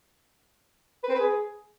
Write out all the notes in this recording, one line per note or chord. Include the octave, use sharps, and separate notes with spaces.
B4
C4
B4
G#4